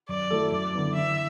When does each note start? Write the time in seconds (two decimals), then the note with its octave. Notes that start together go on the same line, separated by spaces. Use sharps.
0.09 F#2 D5
0.30 F#3 A3 E4 A4
0.52 F#2 D5
0.74 D3 B3 E4
0.95 E3 E5